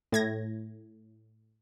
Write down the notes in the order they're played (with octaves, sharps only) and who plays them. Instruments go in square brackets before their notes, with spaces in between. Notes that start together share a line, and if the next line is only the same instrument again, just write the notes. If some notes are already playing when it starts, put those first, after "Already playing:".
[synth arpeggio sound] A2 G#6 A#6